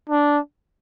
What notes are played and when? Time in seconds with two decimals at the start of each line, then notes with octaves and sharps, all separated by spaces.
0.09 D4